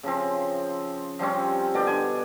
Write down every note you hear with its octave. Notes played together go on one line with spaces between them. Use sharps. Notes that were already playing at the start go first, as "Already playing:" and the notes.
C#3 F3 C4
F3 G3 C4 C#4
B2 D3 D5 G5
D3 G#5